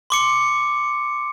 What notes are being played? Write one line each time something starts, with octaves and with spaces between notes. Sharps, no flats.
C6 D6 C#7